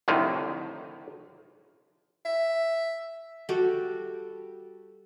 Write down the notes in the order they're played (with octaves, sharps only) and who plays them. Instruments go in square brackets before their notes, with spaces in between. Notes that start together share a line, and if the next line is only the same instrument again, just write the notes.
[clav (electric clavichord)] C2 F2 A2 D3 D#3
[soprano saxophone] E5
[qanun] G3 F#4 G4 A4